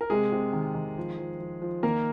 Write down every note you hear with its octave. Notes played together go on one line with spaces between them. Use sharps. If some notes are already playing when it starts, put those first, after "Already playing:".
A#4
C3 G#3 G#4
C3
D#3
D#3
F3
F3
F3
F3
D#3 A#3 A#4